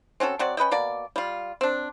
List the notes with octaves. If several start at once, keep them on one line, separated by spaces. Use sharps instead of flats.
C4 C#4 F#4 A4
F#3 C4 F#4 D5
C#4 B4 D#5 G5
B2 A#3 D5
G3 F4
C4 D4